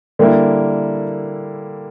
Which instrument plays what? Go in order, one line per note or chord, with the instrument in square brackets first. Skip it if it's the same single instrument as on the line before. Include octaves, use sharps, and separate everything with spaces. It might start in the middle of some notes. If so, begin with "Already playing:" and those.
[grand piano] D3 G3 A#3 E4